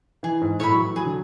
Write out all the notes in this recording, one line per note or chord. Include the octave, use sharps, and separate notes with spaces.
E3 G#4
G#2
A2 C#5 E5 B5
F#3
E3
F#3 G#4
D3